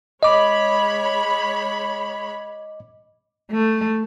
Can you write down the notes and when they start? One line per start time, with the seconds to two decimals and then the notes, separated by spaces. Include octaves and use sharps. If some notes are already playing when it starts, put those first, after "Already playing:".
0.23 G#3 C#5 D#5 B5 D6
3.51 A3